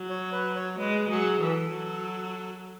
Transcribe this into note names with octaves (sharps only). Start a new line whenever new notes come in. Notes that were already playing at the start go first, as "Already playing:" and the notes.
Already playing: F#3
C#5
B4
C#5
G#3 B4
F#3 G#4
E3 A4
F#3